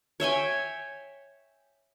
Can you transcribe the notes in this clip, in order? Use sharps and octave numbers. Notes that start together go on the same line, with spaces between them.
C#5 E5 G5 G#5